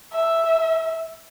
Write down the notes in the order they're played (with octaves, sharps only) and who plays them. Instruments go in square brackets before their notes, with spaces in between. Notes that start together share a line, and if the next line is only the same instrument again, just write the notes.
[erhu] E5